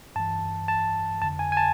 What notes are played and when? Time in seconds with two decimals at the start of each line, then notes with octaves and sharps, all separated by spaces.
0.16 G2 E3 A5
0.68 A5
1.22 F2 D3 A5
1.39 G#5
1.52 G#5
1.57 A5